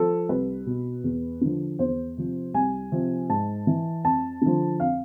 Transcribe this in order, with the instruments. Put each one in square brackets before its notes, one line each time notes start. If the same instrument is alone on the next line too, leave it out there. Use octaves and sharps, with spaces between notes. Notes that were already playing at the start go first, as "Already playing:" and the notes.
Already playing: [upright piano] F3 A4
C2 B4
B2
E2
D3 F3
E2 C5
C3 F3
C2 G#5
C3 F3
G#2 A5
E3
F2 A5
D3 F3
F2 F5